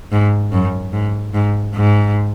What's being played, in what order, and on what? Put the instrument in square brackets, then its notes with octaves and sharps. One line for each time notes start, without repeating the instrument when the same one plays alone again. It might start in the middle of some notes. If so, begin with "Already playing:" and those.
[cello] G#2
F#2
G#2
G#2
G#2